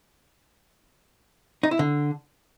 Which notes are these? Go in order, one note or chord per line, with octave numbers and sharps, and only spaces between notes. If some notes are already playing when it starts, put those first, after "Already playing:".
D#4
E4
D3